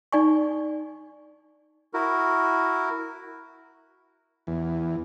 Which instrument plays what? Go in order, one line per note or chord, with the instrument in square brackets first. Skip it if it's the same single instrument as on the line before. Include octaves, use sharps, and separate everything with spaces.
[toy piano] D#4 D5 G#5 C#6
[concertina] E4 F#4 A#4
[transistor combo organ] E2